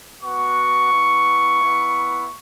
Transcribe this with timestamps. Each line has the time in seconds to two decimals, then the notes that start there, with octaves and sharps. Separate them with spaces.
0.23 B3 F#4 C#6
0.92 B3 E4
1.60 B3 E4